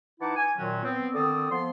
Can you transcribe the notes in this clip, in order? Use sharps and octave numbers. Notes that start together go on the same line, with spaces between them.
E3 D#4 E4 F#5 A5 D6
G#5
F#2 A#2 D#3 F#3 C#4 F#4
B3 C4
D3 D#3 C4 A4 D5 D#6
F3 B3 C6